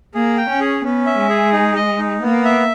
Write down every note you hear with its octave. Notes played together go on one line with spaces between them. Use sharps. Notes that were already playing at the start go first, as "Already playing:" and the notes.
A#3 G#4
G5
C#4
G#4
B3 C#4
E5
G#3
G#4
D#4
D#5
D#4
A#3 B3
E5